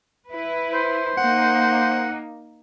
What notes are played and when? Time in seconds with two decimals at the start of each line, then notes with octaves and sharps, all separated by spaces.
0.28 E4 B4
0.74 C5
1.18 A#3 D#4 F#5